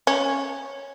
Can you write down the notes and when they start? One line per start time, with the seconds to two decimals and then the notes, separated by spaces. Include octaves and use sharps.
0.07 C#4